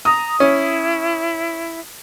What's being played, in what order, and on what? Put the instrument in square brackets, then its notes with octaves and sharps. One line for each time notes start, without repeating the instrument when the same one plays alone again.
[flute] A#5 [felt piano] D#6
[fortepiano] C#4 [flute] E4